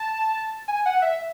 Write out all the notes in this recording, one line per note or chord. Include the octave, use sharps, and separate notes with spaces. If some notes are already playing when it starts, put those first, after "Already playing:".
Already playing: A5
G#5
F#5
E5